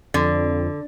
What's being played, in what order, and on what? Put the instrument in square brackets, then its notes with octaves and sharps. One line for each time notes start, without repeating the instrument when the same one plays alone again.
[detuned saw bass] F2 [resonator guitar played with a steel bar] D3